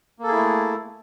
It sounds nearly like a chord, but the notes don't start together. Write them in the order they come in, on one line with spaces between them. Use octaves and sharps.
A#3 A4 G#4 E4 A3